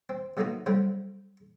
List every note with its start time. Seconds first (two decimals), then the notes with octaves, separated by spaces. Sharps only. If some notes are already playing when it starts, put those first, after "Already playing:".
0.09 C4
0.37 B2 F#3 A3 A#3 D#4 F#4
0.66 C3 F#3 G3 A3 D4